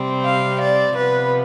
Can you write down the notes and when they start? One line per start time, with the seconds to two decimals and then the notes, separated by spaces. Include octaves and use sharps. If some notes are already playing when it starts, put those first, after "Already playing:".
Already playing: C3 G3 C4
0.26 F5
0.61 D5
0.96 C3 F3 B3 B4